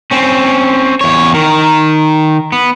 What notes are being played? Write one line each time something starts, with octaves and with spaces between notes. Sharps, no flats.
C4 C#4
E2 C#5
D#3 A#4
B3